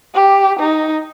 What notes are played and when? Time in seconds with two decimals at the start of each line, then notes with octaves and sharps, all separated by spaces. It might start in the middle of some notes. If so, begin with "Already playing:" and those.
0.15 G4
0.59 D#4